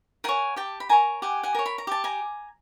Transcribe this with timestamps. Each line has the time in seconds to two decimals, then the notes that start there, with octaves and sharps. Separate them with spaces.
0.24 A#4 C#5 F#5 G#5
0.56 G4 G5 A5
0.80 B5
0.89 A#4 C#5 G#5 A#5
1.22 G4 F#5 G#5
1.43 F#5 G#5
1.55 A#4 C#5
1.66 B5
1.78 A#5
1.87 G4 A5
2.04 G#5 A#5